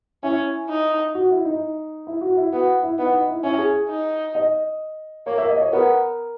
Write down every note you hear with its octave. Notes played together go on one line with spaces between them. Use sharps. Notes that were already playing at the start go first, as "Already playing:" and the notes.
C#4 E4
D#4
F#4
E4
D#4
E4
F#4
E4
B3 F#4
E4
B3 D#4
D#4
E4
C#4 E4
G#4
D#4
D#5
A#3 C#5
E5
D#5
C#5
B3 A#4